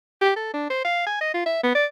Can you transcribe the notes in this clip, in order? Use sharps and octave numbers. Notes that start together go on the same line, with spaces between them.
G4
A4
D4
C5
F5
G#5
D#5
F4
E5
B3
D5